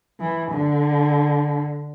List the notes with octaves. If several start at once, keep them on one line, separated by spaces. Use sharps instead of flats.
E3
D3